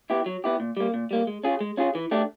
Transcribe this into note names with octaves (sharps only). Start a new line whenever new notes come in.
B3 E4 G4
F#3
B3 E4 G4
A#2
G3 A#3
A#2
G3 A#3
G#3
C#4 F4 G#4
G#3
C#4 F4 G#4
E3
A3 D4 G4